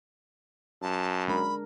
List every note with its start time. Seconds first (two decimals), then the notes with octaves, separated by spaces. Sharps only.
0.82 F#2 A5
1.28 G#3 D4 A#4 B5